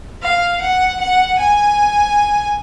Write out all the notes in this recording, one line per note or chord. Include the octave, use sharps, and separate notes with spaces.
F5
F#5
F#5
G#5